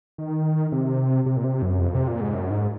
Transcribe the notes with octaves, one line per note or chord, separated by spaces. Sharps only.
D#3
C3
C3
A#2
C3
F#2
F2
C3
A#2
G#2
F#2
G#2